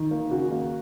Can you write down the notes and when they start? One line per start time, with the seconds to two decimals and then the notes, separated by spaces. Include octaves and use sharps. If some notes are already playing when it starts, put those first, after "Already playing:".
Already playing: D#3
0.11 A#3
0.31 C#3 F#4
0.52 A#3